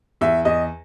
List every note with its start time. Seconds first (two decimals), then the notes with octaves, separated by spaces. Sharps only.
0.21 E2 E5
0.45 E2 D#5